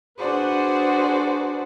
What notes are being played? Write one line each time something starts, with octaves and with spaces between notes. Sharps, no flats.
D4 F#4 G#4 B4 C5 D5